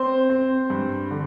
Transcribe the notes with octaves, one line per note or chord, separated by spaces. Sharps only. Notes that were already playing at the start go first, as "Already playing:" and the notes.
Already playing: C4 C5
C4
G2
D3